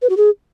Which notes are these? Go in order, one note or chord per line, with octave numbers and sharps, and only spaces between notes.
B4
F#4
G#4